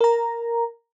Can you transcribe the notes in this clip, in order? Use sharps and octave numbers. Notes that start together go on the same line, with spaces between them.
A#4 A#5